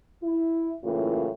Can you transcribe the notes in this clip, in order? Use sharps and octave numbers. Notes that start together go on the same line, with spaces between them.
E4
F#2 A2 C#3 E3 A#3 F4